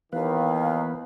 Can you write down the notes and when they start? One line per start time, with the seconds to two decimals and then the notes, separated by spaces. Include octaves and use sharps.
0.13 D#2 D#3 E3 B3 B4 F5